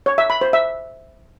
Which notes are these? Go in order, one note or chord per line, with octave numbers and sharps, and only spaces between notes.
C#5
E5
B5
C5
E5